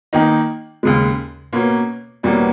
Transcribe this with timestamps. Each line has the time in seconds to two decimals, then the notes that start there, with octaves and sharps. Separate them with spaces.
0.13 D#3 A#3 D#4
0.83 D#2 C#3 G#3
1.53 B2 A#3 C#4
2.23 E2 B2 G3 A#3 C#4